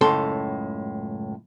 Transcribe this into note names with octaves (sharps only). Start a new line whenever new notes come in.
C#2 F#2 A2 A4 C6